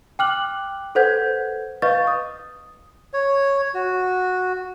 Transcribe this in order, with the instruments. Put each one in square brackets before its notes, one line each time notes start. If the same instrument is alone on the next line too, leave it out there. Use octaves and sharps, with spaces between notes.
[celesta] G5 D6 F6 F#6 F#7
A4 B4 C5 F#5 G6 G#6
B4 D#5 F5 C#6 G6 A6
D#6
[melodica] C#5
F#4